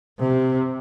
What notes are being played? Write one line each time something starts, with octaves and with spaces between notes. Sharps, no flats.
C3